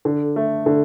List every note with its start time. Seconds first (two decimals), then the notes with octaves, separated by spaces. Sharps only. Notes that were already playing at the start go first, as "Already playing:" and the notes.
0.05 D3
0.36 A3
0.66 D3